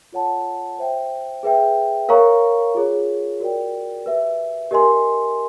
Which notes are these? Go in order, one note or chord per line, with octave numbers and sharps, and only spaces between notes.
F4 A4 C#5 F#5 A5
C5 E5 G5
G#4 B4 E5 G5
A#4 C#5 F5 A#5 C#6
F4 G#4 C#5
F#4 A#4 D5 G5
G4 B4 E5
G4 A#4 D#5 G#5 C6